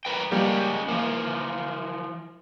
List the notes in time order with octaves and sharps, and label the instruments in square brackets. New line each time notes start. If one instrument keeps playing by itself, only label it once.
[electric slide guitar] A#4 B4 G5
[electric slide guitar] F3 G#3 C#4 [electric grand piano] G3 A#3 G4
[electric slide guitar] E3 F3 [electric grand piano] A#3